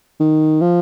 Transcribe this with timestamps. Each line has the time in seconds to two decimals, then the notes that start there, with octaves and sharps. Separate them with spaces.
0.20 D#3
0.61 F3